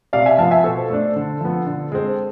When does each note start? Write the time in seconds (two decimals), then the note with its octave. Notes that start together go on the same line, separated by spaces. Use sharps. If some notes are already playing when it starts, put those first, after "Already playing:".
0.13 C3 D5 F5
0.26 E5 G#5
0.38 F3 B3 F5 A5
0.51 E5 G#5
0.64 B2 A4 C5
0.90 A3 D4
1.16 D3
1.41 F3 B3
1.67 D3
1.92 G#3 C4